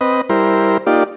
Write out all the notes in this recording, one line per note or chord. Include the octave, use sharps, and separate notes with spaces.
C4 B4 D#5
G3 E4 A#4 C5
A#3 D#4 F4 G4 D5